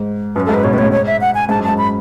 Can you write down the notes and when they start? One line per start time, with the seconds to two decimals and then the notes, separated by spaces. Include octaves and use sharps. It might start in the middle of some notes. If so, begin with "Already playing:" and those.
Already playing: G#2
0.35 F#2 B4
0.45 A4
0.49 G#2
0.54 B4
0.64 B2 C#5
0.73 A2 B4
0.78 C#5
0.83 G#2
0.92 C#5
1.07 E5
1.21 F#5
1.35 G#5
1.49 G#2 A5
1.59 F#2
1.64 G#2 A5
1.78 B5